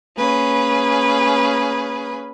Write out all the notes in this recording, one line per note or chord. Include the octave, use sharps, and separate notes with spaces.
A#3 C#4 G#4 B4